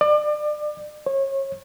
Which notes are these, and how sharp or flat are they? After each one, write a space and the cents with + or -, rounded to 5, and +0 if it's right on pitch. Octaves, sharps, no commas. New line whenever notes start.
D5 +30
C#5 -30